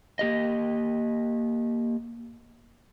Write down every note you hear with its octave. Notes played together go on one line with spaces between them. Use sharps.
A#3 G4 D#5